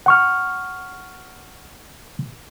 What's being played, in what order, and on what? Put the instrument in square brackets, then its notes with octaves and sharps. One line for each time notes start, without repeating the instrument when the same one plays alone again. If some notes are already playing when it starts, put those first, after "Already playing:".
[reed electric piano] F#5 C#6 F6